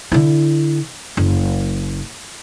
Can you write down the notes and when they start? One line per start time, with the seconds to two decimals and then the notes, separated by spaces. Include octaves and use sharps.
0.12 D3 E4
1.17 F#1